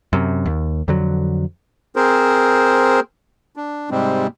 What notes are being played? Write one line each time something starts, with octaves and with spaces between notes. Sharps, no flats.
F#2 C3
D#2
F2 D3 F#3
C4 G#4 A#4 C5
D4
G#2 C3 G3 G#3 C4